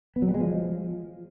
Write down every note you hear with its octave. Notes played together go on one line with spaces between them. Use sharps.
B3
F#3
G3
G#3
F3